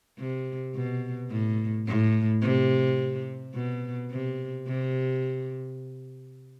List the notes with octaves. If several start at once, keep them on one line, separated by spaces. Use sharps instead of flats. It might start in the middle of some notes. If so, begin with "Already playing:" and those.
C3
B2
A2
A2
C3
B2
C3
C3